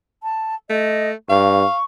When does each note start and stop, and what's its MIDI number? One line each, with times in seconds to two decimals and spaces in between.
0.23 0.55 81
0.70 1.14 57
0.70 1.10 75
1.30 1.64 43
1.30 1.76 77
1.30 1.84 85